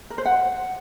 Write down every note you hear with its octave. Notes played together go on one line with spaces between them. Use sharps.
A#4
C5
F#5